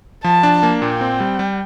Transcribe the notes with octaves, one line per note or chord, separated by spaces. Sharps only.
F3 A5
D4
A#3
A#2 G5
C4
G3
G3